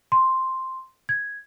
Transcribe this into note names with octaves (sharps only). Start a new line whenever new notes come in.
C6
G#6